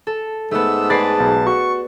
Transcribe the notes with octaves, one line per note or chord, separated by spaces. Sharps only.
A4
G#2 A3 B3 E6
G#4 B4 D5 A5 A6 C7
B1
F#4 C#6